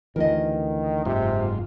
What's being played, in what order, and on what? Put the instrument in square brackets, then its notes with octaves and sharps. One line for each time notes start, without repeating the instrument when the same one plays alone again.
[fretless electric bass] D2 E3 [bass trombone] D#3 [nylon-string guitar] A#4 D#5
[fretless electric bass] F#1 [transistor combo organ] G#2 F4 [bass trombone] C3